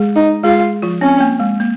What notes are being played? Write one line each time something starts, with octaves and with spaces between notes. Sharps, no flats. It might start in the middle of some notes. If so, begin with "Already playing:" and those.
Already playing: G#3 G#4
D#4
G#3 F4 G#4
F3 F4
C4 C#4
A#3
G#3
A#3